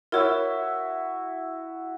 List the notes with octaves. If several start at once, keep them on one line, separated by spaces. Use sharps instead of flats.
E4 F#4 A#4 C#5 E5